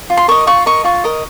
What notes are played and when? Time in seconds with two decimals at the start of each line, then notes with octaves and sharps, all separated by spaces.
0.10 F4
0.17 C6
0.28 A#4 D#5 C#6
0.47 F4 C#6
0.66 A#4 D#5 C#6
0.84 F4 C#6
1.04 A#4 D#5